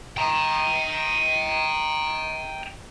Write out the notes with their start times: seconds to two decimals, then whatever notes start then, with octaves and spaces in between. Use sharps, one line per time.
0.17 G5 A#5